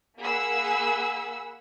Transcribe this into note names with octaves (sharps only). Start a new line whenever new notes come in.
A#3 G#4 F#5 B5 E6